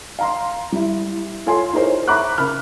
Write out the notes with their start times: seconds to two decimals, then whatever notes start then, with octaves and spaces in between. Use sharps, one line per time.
0.19 F5 A#5 C6
0.72 G3 E4
1.46 F4 A4 C#5 G#5 C6
1.73 D#4 E4 G#4 A#4 C5 C#5
2.08 E5 A#5 B5 C#6 D6 F#6
2.38 C#3 A#4 B5 F6